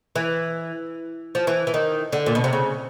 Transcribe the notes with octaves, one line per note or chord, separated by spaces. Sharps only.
E3
F3
E3
E3
D#3
D3
A#2
B2
C3
C#3